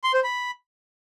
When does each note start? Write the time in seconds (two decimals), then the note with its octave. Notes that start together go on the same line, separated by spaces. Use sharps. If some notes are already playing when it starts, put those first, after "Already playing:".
0.04 C6
0.14 C5
0.24 B5